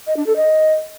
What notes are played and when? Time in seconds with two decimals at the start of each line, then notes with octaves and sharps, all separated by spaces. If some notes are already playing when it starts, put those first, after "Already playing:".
0.07 D#5
0.17 D4
0.26 A4
0.36 D#5